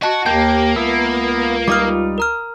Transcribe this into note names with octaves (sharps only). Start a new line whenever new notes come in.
F#4 D#5 A5
D#2 A#3 G4 G5 A5
C#2 B3 E5
G3 D#4 F4 D6 D#6 F6
A#4 A#5 F6